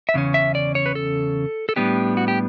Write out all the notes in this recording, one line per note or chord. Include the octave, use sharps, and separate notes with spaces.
E5
E2 C#3 C#4
E5
D5
C#5
B4
A4
A4
A2 G3 B3 D4 G4
F#4
G4